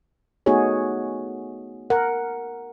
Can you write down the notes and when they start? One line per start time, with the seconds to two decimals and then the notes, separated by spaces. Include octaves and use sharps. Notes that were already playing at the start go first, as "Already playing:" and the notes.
0.46 A3 B3 D#4 F#4 G#4 C#5
1.90 A#4 F#5